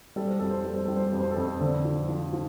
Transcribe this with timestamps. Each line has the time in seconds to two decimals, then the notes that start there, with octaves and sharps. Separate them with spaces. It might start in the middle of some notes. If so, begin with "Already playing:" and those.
0.16 G3 A4
0.27 C5
0.39 F2 A4
0.50 C5
0.62 G3 A4
0.74 C5
0.85 G3 A4
0.97 C5
1.08 F2 A4
1.20 C5
1.31 A4
1.37 F2
1.61 D3 C5
1.85 F3
2.09 F3
2.33 F3